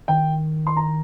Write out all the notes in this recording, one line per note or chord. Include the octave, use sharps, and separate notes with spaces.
D#3 G5
C6
A#5